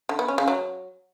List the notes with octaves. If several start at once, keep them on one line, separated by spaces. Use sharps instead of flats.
D3
B3
C#4
C#3
F#3